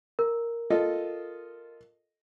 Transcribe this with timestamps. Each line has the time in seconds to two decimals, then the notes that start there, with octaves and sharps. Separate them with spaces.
0.19 A#4
0.70 F4 A4 D#5